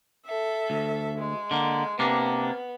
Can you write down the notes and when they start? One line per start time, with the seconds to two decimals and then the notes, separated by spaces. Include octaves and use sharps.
0.24 A4 E5
0.70 D2
1.18 G#3
1.51 D3 A#3
1.99 C3 A#3 B3 D4